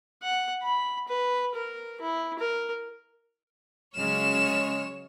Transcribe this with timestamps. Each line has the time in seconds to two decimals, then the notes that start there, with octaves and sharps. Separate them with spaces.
0.23 F#5
0.63 B5
1.08 B4
1.55 A#4
2.01 E4
2.39 A#4
3.96 C#3 F#3 G#3 C#5 F6 E7